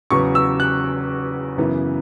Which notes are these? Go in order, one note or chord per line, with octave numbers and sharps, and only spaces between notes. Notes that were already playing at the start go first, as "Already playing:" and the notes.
E2 C#3 F#3 C#6
E6
F#6
F#2 C#3 E3 B3